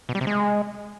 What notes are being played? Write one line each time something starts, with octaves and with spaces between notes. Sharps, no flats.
B2
G3
C3
G#3